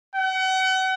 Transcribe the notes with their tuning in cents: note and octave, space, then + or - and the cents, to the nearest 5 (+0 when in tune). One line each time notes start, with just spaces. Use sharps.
F#5 +35